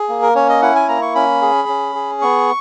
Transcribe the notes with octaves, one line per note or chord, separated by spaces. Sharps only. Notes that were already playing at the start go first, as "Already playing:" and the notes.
Already playing: G#4
A#3
A#4
C#4 C#5
D#5
E4 F#5
G#5
A#3 A#5
C#6
C#4 B5
G#4
C#4
G#4
B3 C#6